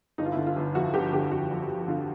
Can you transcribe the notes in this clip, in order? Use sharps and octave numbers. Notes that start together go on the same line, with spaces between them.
G1 D#4
F4
E4
D3
F4
G1
F2 F#4
G1 G4
D3 G4
G1 F#4
F2
G1
D3 F4